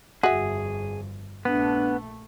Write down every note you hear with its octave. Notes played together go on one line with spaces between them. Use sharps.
G1 F2 F#4 G#4 E5
A#1 A3 B3 D4